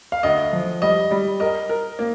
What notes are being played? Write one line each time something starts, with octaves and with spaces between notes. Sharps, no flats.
F5
D2 D#5
F3
G3 D#5
G3
A#4 D#5
A#4
A#3